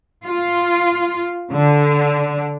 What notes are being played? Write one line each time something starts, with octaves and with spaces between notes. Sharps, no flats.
F4
D3